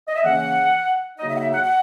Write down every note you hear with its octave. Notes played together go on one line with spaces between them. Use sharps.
D#5
E5
C#3 E3 A#3 C#4 F#5
C#3 F#3 A#3 D#4 D#5
E5
F#5
E5
F#5
F#5